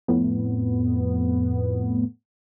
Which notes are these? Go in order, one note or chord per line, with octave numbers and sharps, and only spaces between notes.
F2 A2 B3